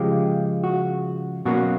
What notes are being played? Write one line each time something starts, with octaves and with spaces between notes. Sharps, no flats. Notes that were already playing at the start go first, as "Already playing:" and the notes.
Already playing: C#3 F3 G#3 G4
F#4
B2 F#3 A#3 C#4 F#4